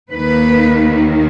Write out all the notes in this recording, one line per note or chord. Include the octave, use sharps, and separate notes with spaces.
D#2 D#3 A#3 B4